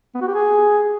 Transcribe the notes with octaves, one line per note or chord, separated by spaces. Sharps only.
B3
F#4
G4
G#4